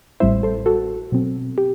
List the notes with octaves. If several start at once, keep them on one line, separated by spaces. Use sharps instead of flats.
A1 A2 G3 C4 E4 C5 E5
A4 C5
F#4 A4
B2 F#3 C4
G4